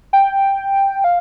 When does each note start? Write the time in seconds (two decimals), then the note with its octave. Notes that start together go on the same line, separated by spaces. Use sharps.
0.13 G5
1.04 F5